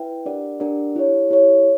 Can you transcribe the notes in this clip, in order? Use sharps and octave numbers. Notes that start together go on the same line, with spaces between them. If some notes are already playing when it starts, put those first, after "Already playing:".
Already playing: E4 B4 E5 G5
D4 G4 A#4 D5 F#5
D4 G4 A#4 D5 F#5
E4 G4 C#5
E4 G4 C#5